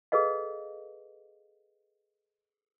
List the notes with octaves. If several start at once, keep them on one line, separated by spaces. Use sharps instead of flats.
G#4 A4 B4 D#5 F5